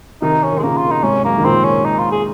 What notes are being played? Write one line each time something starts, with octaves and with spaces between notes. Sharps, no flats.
C3 D#3 D#4
C#4
D#3
G#3
A#2 C#3 A#3
F4
D#4
G#2 C3 C#4
F#2 A#3
D#3
A#2 C#3 C4
C#4
D#4
F4
G#4